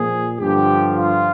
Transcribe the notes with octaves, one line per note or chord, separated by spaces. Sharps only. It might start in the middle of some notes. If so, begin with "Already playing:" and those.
Already playing: A#2 F3 G#4
G2 D3 F3 G4
F4